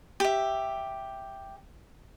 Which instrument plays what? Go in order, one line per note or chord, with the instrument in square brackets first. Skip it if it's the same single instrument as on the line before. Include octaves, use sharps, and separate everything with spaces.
[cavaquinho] G4 E5